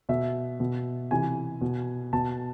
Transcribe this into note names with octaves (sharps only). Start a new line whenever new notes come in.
B2 E5
B2
C3 E3 G#5
B2
B2 A5